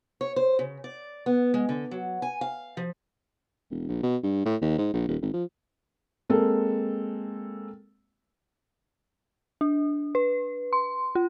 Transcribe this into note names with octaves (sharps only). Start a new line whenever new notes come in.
C#5
C5
C#3
D5
B3
G#3
D3
F#3
G#5
F5
F3
E1
A#1
B2
G2
A2
D#2
G#2
A#1
D#1
G#1
F3
G#3 A#3 C4 A4
D4
B4
C6
F4